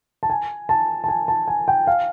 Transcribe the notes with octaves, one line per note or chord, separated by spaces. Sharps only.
A5
G#5
A5
A5
G#5
A5
G#5
G5
F5